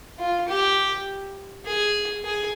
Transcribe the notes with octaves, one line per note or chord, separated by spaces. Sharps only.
F4
G4
G#4
G#4